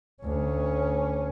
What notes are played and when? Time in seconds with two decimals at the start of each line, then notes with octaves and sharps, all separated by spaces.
0.23 D2 C#4